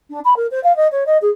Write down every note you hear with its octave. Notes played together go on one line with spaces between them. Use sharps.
D4
B5
A#4
C5
F5
D#5
C#5
D#5
G#4